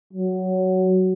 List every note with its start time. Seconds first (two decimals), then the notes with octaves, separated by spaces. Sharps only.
0.13 F#3